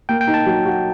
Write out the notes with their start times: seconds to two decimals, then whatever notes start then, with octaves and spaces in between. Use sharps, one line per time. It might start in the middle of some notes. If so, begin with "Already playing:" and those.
0.09 A#3 G5
0.21 G5
0.27 D#4
0.34 A5
0.46 F#3
0.66 F#4